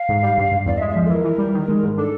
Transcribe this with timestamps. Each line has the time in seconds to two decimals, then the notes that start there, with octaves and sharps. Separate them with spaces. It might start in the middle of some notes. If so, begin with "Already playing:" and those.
Already playing: F5
0.09 G#2
0.23 G3
0.38 G2
0.52 G2
0.66 E2 D5
0.77 E5
0.81 G#3
0.89 E5
0.96 F3
1.05 A4
1.09 E3 A#4
1.24 E3
1.38 G3
1.54 D#3
1.68 G#3
1.83 G#2
1.97 D4 A4